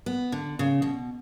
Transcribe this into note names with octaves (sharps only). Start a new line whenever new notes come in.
B3
D3
C#3
B2